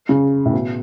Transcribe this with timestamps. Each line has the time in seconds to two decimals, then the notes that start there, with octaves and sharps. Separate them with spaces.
0.09 C#3
0.45 A2
0.53 B2